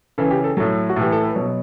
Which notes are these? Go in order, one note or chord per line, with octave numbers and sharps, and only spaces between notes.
C#3 E3 A4
G4
A4
A2 F#3 A4
F#4
A2 E3 G4
A4
B4
B2 F#3 C#5